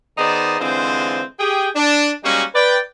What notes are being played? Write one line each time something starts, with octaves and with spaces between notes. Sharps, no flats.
D#3 B3 D#4 G#4 C5 D5
D3 E3 G#3 C4 F4 C5
G4 G#4 G5
D4
G3 G#3 A#3 C#4 D#4 F#4
B4 D5 G5